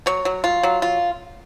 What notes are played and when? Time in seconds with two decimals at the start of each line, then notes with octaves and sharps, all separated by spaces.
0.06 F#3 C#5
0.25 F#3
0.44 F4
0.63 F#3
0.82 F4